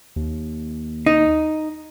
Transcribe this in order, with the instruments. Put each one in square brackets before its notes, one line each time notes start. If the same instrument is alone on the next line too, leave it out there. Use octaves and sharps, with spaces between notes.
[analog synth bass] D#2
[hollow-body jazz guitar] D#4